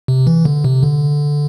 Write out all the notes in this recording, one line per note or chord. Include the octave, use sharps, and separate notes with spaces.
C3
E3
D3
C3
D3